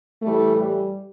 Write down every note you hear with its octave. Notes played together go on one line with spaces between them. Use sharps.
A2 E3 G3 A3
G3